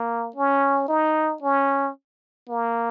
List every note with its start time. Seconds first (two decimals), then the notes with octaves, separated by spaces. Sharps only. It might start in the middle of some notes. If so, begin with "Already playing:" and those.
Already playing: A#3
0.36 C#4
0.88 D#4
1.42 C#4
2.49 A#3